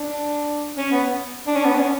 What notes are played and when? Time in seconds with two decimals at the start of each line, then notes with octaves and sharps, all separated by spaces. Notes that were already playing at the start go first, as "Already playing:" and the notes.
Already playing: D4
0.78 C#4
0.92 B3
1.47 D4
1.56 C#4
1.65 B3
1.75 D4
1.79 C#4